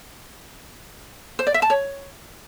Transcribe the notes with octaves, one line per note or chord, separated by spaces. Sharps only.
C5
D5
E5
A5
C#5